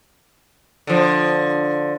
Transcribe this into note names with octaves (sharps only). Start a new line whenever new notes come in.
D3 F3